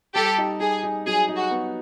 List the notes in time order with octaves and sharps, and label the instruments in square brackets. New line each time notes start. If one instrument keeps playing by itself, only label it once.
[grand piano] G3 [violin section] G4 A4
[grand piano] D#4
[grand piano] G3 [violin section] G#4
[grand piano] D#4
[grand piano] F#3 [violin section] G#4
[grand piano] D#4
[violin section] F#4
[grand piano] B3